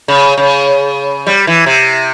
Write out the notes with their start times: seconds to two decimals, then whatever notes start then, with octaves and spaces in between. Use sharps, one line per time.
0.08 C#3
0.38 C#3
1.27 G3
1.47 E3
1.66 C3